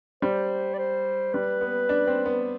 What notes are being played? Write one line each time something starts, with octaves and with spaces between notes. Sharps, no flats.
G3 C5
D5
C5
G3 B4
B3
D4
C4
B3